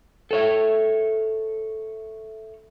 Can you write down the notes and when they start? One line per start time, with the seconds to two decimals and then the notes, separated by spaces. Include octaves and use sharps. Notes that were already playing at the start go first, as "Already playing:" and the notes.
0.31 A4 C#5 E5